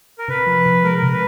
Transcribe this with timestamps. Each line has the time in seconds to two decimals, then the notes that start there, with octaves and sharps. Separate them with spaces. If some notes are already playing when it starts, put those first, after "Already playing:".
0.19 A#4
0.28 C3 B4
0.46 F3
0.66 C3
0.84 G#3 A#4
0.98 A#4
1.03 C3
1.12 B4